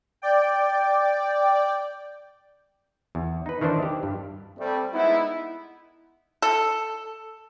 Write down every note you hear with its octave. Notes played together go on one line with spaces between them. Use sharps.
D5 G5
E2
D#4 B4
D#3 E3 D4 C5
G4
G2
G3 A3 C4
G#3 B3 D#4 E4
A4